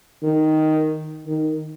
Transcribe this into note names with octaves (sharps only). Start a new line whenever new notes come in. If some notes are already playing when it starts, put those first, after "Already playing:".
D#3
D#3